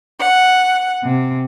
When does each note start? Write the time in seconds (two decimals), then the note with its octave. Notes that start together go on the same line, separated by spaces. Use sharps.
0.19 F#5
1.04 C3